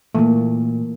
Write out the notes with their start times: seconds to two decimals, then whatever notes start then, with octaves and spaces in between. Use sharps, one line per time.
0.15 A#2 E3 A3 A#3